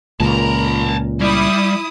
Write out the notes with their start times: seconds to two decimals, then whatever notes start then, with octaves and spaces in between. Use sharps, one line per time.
0.20 C#2 A#2 A#4 A5 A#5
1.21 G3 E4 D#6